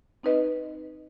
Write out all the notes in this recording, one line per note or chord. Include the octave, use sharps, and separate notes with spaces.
C4 D#4 B4 D#5